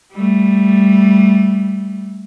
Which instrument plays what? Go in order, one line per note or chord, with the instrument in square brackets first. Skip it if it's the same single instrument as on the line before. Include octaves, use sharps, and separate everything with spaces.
[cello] G3 A3